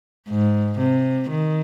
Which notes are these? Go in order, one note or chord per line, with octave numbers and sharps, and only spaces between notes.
G#2
C3
D#3